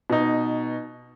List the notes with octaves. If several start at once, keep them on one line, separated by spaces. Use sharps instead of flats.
B2 D#4